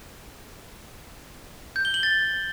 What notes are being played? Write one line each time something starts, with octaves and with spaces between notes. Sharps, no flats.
G6
G7
F#7
A6